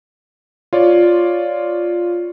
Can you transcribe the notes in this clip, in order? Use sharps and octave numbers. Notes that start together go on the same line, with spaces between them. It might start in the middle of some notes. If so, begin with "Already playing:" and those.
F4 C#5 D5